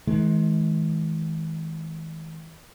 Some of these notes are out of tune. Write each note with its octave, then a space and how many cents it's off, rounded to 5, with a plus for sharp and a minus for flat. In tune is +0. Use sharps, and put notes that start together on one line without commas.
E3 -45 G#3 +30